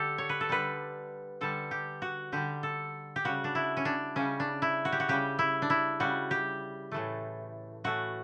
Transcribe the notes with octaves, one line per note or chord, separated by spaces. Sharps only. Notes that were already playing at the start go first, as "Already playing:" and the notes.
Already playing: D3 G4 A4
C#5
B4
A4
D3 G3 B4
D3 G3 A4
G4
F#4
D3 G3 G4
A4
G4
C#3 G3 F#4
D4
E4
C#4
D4
C#3 G3 C#4
D4
E4
F#4
G4
F#4
C#3 G3 G4
E4
D4
E4
C#3 G3 F#4
G4
A2 E3 A3
A2 E3 A3 F#4